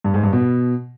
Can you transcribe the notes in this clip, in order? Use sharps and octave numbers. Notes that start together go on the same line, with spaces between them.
G2
G#2
G2
B2